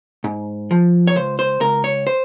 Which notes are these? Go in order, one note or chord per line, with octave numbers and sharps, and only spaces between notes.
G#2
F3
C#5
C#2 C5
C5
C#2 A#4
C#5
C5